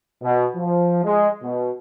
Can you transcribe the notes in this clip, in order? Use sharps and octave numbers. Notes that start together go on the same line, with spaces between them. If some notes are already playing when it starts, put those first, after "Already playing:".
B2
F3
G#3
B2